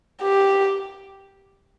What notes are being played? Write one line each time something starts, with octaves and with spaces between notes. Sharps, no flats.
G4